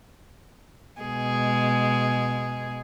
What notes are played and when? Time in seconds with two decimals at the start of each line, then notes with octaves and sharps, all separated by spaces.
1.01 B2 G#3 G#4